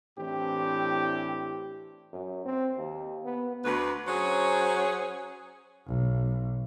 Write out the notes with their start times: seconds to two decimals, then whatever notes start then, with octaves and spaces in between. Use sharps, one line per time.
0.19 A2 E3 C4 D4 G4
2.13 F#2
2.45 C4
2.78 D#2
3.25 B3
3.65 D2 B4
4.07 F#3 C#4 G#4 C5 C#5
5.87 B1